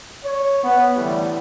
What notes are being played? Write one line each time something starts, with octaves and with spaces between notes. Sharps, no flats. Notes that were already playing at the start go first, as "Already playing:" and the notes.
C#5
B3
A2 D3 E3 G3